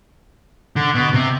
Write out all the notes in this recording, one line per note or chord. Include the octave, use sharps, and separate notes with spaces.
D3
B2
C3